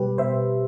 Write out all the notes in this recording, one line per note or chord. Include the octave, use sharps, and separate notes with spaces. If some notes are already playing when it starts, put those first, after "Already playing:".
Already playing: B2 G3 G4 B4
B2 C5 E5